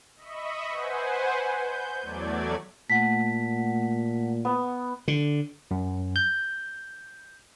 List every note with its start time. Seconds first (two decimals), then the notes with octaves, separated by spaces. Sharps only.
0.16 D#5 E5 B5 C#6
0.70 B4 C5 F#5 G#5
1.46 G6
2.01 E2 F#3 A3 D5 G#6
2.90 A#2 A3 F#5 B6
4.45 B3
5.08 D3
5.71 F#2
6.16 G6